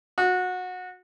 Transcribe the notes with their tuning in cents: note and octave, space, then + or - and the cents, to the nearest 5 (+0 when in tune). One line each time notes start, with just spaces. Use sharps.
F#4 -20